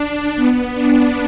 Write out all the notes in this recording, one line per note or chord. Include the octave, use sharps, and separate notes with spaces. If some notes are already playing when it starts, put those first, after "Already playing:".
Already playing: D4
B3
D4